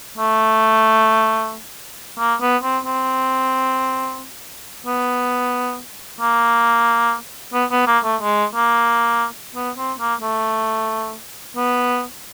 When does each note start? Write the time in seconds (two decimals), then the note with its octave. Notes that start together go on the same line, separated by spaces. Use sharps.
0.18 A3
2.19 A#3
2.41 B3
2.63 C4
2.85 C4
4.86 B3
6.21 A#3
7.53 B3
7.71 B3
7.87 A#3
8.04 A3
8.22 G#3
8.55 A#3
9.55 B3
9.77 C4
9.99 A#3
10.22 A3
11.56 B3